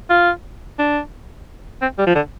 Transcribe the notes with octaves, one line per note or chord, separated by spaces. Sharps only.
F4
D4
C4
G3
F3
D3